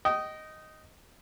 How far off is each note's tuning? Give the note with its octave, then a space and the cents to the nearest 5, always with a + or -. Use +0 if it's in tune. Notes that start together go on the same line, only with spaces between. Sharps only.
D#5 +0 G5 -30